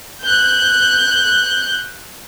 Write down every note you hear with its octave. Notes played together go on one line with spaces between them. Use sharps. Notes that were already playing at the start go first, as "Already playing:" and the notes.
F#6 G6